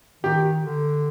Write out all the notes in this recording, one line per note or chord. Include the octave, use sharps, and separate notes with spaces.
D#3 G4
D3